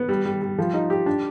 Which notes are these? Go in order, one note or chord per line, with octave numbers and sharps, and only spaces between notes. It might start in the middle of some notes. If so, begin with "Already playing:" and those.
Already playing: B3
G3
G3
G3
F3
D#4
G4
D4